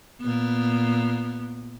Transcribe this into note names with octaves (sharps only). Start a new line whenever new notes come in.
A#2 B3